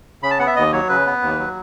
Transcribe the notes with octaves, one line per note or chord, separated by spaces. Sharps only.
C#3 B5
A5
B3 F#5
E5
D#2 D#5
F#3 C#5
C#3 B4
B3
D#2
F#3